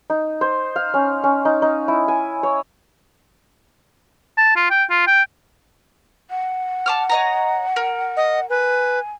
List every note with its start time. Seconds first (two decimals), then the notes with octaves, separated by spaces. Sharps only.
0.10 D#4
0.41 C5
0.76 F5
0.94 C#4
1.24 C#4
1.45 D#4
1.62 D#4
1.88 E4
2.08 G#5
2.43 C#5
4.38 A5
4.56 F4
4.70 G5
4.90 F4
5.08 G5
6.30 F#5
6.86 A5 D6 F6
7.10 C#5 D#5 A#5
7.76 A#4
8.17 D#5
8.50 B4 G#5